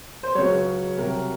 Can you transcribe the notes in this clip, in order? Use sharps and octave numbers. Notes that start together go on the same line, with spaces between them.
C5
C#2 C#3 F#3 C#5
C2 C3 F#3 A#4